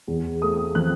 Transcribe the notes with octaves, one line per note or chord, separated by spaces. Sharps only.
E2
A3 D#6
F3 F#6